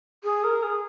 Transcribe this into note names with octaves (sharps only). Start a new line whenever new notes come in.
G#4
A#4
G#4